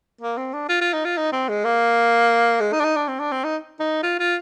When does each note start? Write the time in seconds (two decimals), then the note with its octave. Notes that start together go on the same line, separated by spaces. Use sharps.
0.21 A#3
0.37 C4
0.53 D4
0.69 F4
0.81 F4
0.93 D#4
1.05 F4
1.17 D#4
1.32 C4
1.49 G#3
1.64 A#3
2.60 G#3
2.72 D#4
2.80 D4
2.84 D#4
2.96 D4
3.08 C4
3.19 D4
3.32 C4
3.44 D#4
3.79 D#4
4.03 F4
4.19 F4